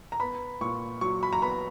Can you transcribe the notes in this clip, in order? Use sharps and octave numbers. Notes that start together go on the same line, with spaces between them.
A#5
B3 B5
A#2 C#6
F#3 C#6
B5
A#5
B3 B5